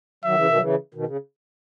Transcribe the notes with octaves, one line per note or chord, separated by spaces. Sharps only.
D#3 F#3 E5
C#3 E3
B2 D#3
F#3
C#3 E3
B2 D#3
C#3